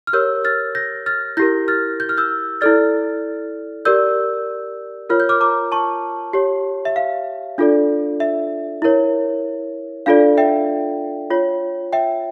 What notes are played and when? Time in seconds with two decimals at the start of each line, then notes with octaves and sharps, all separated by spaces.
0.07 F6
0.13 G4 A#4 C#5 E6 G6
0.44 F6 A6
0.75 G6 A#6
1.06 F6 A6
1.37 E4 G4 A#4 G6 A#6
1.68 F6 A6
2.00 G6
2.09 F6
2.17 E6 G6
2.61 E4 A4 D5 F6 A6
3.85 G4 A#4 D5 E6 G6
5.10 F4 A#4 C#5 F6
5.20 G6
5.29 D6 F6
5.41 A#5 D6
5.72 A5 C#6
6.33 G4 C#5
6.85 E5
6.96 F5
7.58 D4 F4 A4 D5
8.20 E5
8.82 E4 A#4 C#5
10.06 D4 F4 A4 D5 F5
10.38 E5 G5
11.30 F4 C#5
11.93 E5 G5